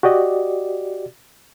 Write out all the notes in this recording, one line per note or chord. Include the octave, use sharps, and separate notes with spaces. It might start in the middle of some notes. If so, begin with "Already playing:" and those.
F#4 G4 D5 D#5